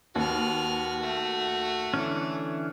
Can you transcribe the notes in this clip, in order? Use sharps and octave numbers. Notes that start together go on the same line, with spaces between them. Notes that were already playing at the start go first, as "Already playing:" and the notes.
D#2 F#4 B4 F6
A3
D3 E3 C#4